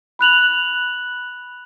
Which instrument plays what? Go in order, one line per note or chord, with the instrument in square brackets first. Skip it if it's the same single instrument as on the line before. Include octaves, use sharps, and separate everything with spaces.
[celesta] B5 F#6 F7 F#7